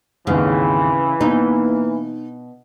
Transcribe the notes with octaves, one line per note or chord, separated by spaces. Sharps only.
D#2 G#2 C#3 E3 C4
B2 A#3 D#4